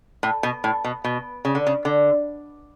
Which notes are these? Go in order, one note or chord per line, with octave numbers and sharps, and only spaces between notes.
A2
B2
A2
B2
B2
C#3
D3
C#3
D3